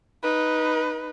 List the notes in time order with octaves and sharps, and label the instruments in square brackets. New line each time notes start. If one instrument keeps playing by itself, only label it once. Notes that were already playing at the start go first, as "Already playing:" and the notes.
[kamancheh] D#4 B4